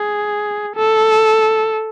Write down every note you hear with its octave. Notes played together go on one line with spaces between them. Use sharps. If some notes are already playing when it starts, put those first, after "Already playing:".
Already playing: G#4
A4